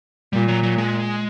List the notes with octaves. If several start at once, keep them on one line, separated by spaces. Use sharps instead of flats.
A#2 G3
F#3
F#3
G#3